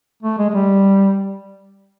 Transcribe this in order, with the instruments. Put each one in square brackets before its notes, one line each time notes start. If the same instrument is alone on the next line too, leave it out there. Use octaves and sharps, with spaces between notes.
[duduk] A3
G#3
G#3
G3